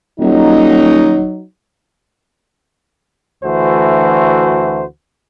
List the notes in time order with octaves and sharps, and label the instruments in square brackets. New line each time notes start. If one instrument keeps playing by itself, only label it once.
[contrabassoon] D#1 [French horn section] F#3 D#4
[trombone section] D2 E3 A3 F#4 C5